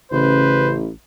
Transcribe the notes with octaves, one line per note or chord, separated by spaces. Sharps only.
A1 C#3 B4 C5